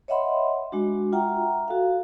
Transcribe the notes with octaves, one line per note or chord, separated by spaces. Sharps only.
C#5 D#5 E5 F#5 B5 C6
G#3 D4 F#4
F4 E5 F#5 G5 A#5
F#4 A4 F5